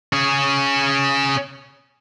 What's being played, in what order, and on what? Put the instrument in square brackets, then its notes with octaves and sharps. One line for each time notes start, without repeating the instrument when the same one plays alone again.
[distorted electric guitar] C#4 G#4